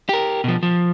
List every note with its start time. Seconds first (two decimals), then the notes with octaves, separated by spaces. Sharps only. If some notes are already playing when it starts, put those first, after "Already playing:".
0.09 G4 A#4
0.44 B2 F3
0.63 F3